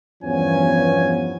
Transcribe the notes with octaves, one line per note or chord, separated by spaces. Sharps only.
E2 G2 F3 B3 C#4 G#5